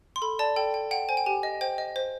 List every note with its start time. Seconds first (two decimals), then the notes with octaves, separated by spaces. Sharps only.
0.16 C6
0.22 A4 B5
0.39 D5 A5
0.56 A4 G5
0.74 G5
0.91 F#5 G5
1.09 C5 G#5
1.17 G5
1.26 G4 G#5
1.43 D#5
1.61 C5 G5
1.78 D#5
1.96 C5